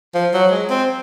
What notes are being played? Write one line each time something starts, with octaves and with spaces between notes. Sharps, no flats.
F3
F#3
G#3
C4